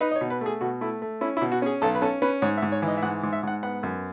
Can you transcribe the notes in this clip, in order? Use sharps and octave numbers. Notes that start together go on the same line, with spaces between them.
D#4 B4
D#5
C#5
B2
B4
A3 G#4
B2 F#4
A3 E4
A3
C#4 E4
E4
B2
F#4
C#4 G#4
B1 A4
B4
C#4 A4
C#4 B4
G#2 C#5
E5
G#2
C#5
E3
D#5
E5
G#2 F#5
G#2
E5
G#2 F#5
B3 F#5
F#2